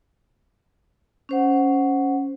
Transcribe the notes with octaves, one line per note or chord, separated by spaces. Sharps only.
C#4 C5 F#5